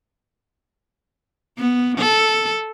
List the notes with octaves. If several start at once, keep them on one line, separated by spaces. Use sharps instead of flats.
B3
A4